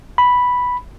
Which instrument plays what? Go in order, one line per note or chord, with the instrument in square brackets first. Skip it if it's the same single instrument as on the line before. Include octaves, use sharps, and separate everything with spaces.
[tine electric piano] B5